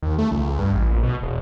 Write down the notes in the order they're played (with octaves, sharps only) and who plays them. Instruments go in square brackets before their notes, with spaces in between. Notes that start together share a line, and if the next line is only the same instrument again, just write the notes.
[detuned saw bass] D#2
A3
C#2
C#2
G2
A1
A#1
B2
E1